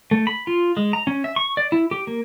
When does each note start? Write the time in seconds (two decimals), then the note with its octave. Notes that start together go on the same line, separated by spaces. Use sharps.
0.11 A3
0.27 B5
0.47 F4
0.77 G#3
0.93 A#5
1.07 C#4
1.24 E5
1.36 C#6
1.57 D5
1.72 E4
1.91 G4
2.07 A#3